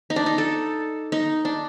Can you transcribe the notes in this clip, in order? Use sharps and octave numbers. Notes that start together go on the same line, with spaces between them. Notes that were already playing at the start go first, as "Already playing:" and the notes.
D#4
D4
D#4
A4
D#4
D4